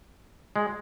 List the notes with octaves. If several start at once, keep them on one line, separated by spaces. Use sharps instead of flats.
G#3